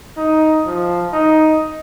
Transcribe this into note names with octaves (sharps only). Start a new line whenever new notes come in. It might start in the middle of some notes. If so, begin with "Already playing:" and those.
D#4
F3
D#4